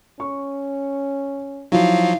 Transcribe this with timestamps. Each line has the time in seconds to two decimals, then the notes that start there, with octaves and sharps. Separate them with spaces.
0.20 C#4 C#6
1.72 F3 F#3 D#4 E4 F#4 F5